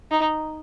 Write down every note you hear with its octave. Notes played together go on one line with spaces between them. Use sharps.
D#4